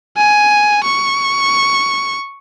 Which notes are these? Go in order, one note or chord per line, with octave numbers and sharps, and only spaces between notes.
G#5
C#6